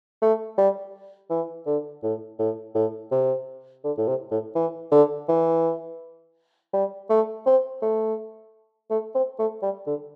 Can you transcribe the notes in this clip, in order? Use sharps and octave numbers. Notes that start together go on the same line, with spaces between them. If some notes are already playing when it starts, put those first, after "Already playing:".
A3
G3
E3
D3
A2
A2
A2
C3
D3
A2
C3
A2
E3
D3
E3
G3
A3
C4
A3
A3
C4
A3
G3
D3